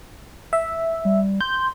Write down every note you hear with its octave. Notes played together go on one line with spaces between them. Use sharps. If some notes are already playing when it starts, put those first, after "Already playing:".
E5
G3
C6 G6